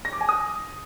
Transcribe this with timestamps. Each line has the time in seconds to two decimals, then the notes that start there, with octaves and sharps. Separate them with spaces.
0.05 A#6
0.13 D6
0.21 G#5
0.29 D#6